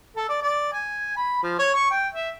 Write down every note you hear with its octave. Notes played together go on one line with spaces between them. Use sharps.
A4
D5
D5
G#5
B5
F3
C#5
C#6
G5
E5